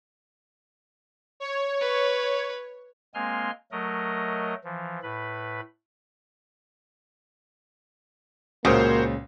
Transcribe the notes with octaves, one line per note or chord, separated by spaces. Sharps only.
C#5
B4
G#3 A#3 C4 G#5 C6 F6
F#3 A3 A#4 D#5
E3 F3
A2 B4 B5
C#2 A#2 C#3 A#3 F#4 C5 C#5